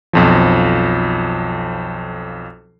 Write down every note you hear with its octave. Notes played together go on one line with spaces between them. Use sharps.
B1 F2 F3